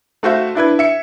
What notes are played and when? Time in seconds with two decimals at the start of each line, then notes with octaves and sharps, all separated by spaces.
0.23 A3 F#4 C5 E5 F5
0.55 D4 E4 B4 G#6
0.79 E5 C#7